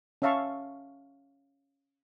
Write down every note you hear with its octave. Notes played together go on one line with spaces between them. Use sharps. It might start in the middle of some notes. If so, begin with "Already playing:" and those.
C#4 C#5 E5 F5 A5 C#6